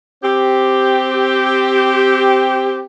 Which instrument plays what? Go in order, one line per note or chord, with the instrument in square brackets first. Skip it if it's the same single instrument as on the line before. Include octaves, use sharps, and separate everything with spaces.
[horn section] C4 G4